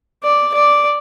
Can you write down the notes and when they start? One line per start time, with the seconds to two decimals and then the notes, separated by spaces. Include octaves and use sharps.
0.23 D5
0.54 D5